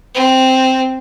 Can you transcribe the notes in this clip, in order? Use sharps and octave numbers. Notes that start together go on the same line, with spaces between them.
C4